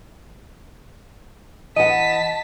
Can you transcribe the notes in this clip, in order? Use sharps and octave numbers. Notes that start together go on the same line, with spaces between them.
E3 D#5 F#5 A5 B6